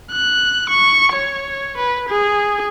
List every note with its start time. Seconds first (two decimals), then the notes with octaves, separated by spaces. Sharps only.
0.12 F#6
0.70 C#6
1.12 C#5
1.77 B4
2.09 G#4